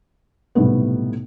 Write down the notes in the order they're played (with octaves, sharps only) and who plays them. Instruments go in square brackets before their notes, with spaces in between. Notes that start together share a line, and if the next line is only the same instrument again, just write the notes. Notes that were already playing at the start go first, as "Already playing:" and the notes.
[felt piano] B1 A2 C3 G3 A3 B3